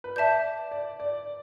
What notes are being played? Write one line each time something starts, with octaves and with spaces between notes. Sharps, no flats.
B4
D5 E5 A5 G6
D5
D5